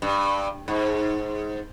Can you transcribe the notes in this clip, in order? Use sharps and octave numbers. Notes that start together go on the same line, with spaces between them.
G2
G#2